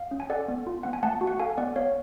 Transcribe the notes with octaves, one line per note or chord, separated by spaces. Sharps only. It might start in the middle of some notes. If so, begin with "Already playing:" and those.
Already playing: F5
C#4
G#5
A4 D5 F#5
B3
F4
B3 F#5
G#5
A3 F#5 A5
F#4
F#5
A4 F5 G#5
B3 D5 F#5
B3 C#5 F5